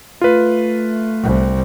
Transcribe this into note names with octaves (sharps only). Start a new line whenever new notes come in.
A3 F4 B4
C2